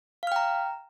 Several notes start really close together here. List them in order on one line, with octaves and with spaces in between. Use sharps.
F5 F6 G5 A#5